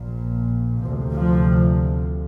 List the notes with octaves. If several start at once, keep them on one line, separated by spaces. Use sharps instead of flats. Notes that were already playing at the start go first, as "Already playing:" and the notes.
Already playing: A#1 A#2
D2 C3 F3
F3